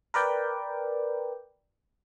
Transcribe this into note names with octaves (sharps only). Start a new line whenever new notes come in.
A#4 B4 D5 G5